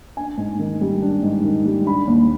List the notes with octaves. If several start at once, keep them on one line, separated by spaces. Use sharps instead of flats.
D4 G#5
G#2
D#3
G3
D4
G#2
D#3
G3
D4 B5
D#2